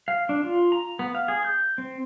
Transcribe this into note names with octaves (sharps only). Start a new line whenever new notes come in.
F5
D4
F4
A#5
B3
F5
G#4
G6
C4